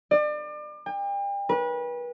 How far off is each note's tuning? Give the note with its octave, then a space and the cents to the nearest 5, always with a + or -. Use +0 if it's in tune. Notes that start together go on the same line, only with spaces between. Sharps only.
D5 +35
G5 +40
B4 -30